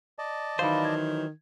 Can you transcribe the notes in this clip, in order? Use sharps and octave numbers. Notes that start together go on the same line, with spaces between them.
D5 D#5 A5
D#3 E3 F#3 C5 F5 B5
G#6